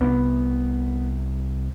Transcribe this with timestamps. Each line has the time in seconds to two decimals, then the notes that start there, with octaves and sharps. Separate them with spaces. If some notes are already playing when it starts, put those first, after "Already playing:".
0.01 C2 B3